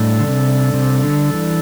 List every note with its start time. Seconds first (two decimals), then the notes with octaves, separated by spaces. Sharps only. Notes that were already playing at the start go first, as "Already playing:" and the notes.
Already playing: A2 G3 D4 A4 D5
0.20 D3
0.27 C3
0.74 C3
1.03 D3
1.34 E3